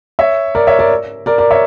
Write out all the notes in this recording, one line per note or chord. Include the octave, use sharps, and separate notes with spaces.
C#5 E5
A#4 D5
C#5 E5
A#4 D5
A#4 D5
A#4 D5
C#5 E5